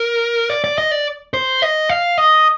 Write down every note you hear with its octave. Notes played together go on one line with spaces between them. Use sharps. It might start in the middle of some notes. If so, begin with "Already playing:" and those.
Already playing: A#4
D5
D5
D#5
D5
C5
D#5
F5
D#5